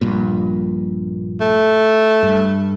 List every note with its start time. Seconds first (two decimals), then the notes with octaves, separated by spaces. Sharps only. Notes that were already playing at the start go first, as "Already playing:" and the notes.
0.01 A#1 G2 A#2
1.41 A3
2.23 G2